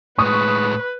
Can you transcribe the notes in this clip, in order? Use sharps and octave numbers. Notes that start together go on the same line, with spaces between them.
A2 G#3 B4 C#6 D#6